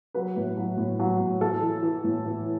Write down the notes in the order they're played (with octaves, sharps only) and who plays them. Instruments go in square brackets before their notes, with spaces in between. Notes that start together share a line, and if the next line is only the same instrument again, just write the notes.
[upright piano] F#3 B4
A2
F#3
A2
F#3
A2
E3 A4
E3
E3
A2
E3